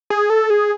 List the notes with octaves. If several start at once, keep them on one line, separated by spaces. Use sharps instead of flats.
G#4
A4
G#4